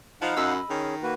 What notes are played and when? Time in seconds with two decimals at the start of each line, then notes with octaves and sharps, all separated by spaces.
0.22 F3 D#4 F5 F#5 B5
0.37 F#2 D#5 B5 E6
0.70 D#3 C#4 G#4
1.03 A#3 F#4 B4